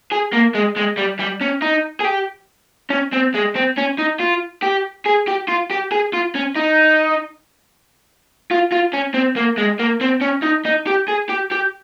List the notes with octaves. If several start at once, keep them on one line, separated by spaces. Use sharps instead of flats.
G#4
A#3
G#3
G#3
G3
G3
C#4
D#4
G#4
G4
C#4
C4
G#3
C4
C#4
D#4
F4
G4
G#4
G4
F4
G4
G#4
F4
C#4
D#4
F4
F4
C#4
C4
A#3
G#3
A#3
C4
C#4
D#4
D#4
G4
G#4
G4
G4